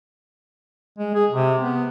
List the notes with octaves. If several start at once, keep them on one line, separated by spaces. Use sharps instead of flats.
G#3
G#4
C3
B3